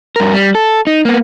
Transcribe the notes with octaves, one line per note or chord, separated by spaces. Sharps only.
G2 A#4
G3
A4
D#4
A#3 B3